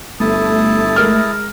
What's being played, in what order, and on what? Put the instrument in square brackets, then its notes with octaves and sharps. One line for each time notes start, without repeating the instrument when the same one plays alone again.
[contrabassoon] G1 [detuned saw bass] A3 [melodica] E4 A5 D#6
[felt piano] G#3 A#4 F6